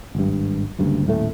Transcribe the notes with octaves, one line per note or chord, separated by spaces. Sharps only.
G#1 G2
F#1 D2 G2
D#1 A2 A3